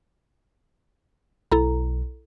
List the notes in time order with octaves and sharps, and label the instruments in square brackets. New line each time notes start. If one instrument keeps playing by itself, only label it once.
[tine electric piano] B1 [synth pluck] E4 A4 A#5